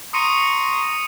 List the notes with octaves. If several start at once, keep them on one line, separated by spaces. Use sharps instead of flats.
A#5 C6 C#6 D#6 C#7 D#7